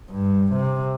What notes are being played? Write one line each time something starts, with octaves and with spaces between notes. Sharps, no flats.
G2
C3